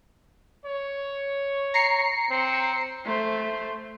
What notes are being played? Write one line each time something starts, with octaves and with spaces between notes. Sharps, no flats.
C#5
A#5 C7 C#7
C4
A3 C5